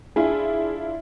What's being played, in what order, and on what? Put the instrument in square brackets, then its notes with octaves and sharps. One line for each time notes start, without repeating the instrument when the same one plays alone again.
[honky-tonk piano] D4 E4 F4 [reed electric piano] G#4